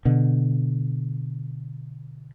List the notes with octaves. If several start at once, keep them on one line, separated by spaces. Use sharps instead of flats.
B2 D3